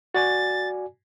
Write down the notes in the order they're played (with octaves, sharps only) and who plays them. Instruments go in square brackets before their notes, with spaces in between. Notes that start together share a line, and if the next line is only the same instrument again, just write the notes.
[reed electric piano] F#4 D5 G#5 [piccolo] A6